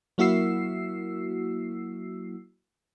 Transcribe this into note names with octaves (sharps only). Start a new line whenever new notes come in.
F#3 A#3 E4 F#4 E6 C7